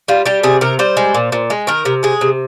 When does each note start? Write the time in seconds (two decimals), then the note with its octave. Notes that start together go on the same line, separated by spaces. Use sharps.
0.08 G3 F4
0.25 G3 G4
0.43 C3 G#4
0.61 C3 A#4
0.79 G3 C5
0.97 G#3
1.14 A#2
1.32 A#2
1.50 G#3
1.67 D#3 A#4
1.85 C3
2.03 G#3 G#4
2.21 C3